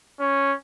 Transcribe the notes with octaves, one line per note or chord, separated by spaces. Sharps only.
C#4